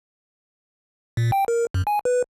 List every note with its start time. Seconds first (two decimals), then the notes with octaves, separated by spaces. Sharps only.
1.17 A#2
1.32 G5
1.48 A#4
1.74 F#2
1.87 G#5
2.05 B4